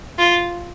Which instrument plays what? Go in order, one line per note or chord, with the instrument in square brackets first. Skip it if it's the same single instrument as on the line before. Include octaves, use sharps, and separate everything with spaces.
[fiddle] F4